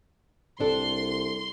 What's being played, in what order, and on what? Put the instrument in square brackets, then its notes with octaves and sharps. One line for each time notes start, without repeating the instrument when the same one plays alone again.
[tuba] C2 [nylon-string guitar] C4 D4 A4 [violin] C6